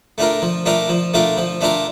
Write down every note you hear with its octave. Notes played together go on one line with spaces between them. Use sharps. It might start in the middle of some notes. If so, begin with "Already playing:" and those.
A3 D4 F4 A#4
F3
A3 D4 F4 A#4
F3
A3 D4 F4 A#4
F3
A3 D4 F4 A#4